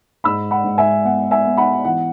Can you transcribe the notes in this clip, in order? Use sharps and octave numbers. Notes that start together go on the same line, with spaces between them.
G#2 B5 E6
F#5 B5
G#2
E5 G#5
B3 F#5
E5 G#5
B3
F#5 B5
E3 F#5